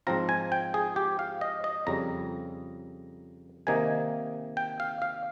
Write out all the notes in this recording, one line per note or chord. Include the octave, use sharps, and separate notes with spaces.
G#2 F3 C4 F4 A#5
G#5
G5
G#4
G4
F5
D#5
D#5
F2 C#3 G3 A#5
C3 D#3 A#3 D#4 G#5
G5
F5
F5